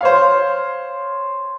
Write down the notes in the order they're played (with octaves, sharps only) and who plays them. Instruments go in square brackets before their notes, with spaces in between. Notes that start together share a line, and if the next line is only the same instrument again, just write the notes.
[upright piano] C5 C#5 F5